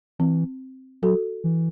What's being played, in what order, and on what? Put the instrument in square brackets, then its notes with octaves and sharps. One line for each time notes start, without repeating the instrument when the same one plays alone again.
[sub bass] E3 [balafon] C4
[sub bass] F#3 [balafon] F#4 A4
[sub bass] E3